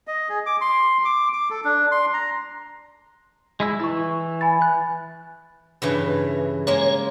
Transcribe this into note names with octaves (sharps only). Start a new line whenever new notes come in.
D#5
G#4
D6
C6
D6
D6
A4
D4
C6
A#5
G#3 E4 E6
E3 E4 C#6 E6
G#5 B5 A6
F#6
G2 C#3 E3
G#3 A#3 C#5